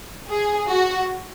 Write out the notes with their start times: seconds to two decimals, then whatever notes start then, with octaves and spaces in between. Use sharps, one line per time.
0.28 G#4
0.68 F#4